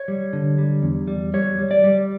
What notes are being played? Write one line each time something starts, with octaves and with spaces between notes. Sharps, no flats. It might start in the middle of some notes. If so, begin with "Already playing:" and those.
Already playing: C#5
G3
D3
G3
E2
G3
G3 C#5
G3
D5
G3